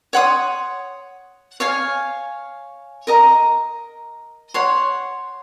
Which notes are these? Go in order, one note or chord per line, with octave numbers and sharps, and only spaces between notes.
C#5 F#5 C6 D#6
C#5 F5 G#5
A#4 D#5 A#5
C#5 F#5 C6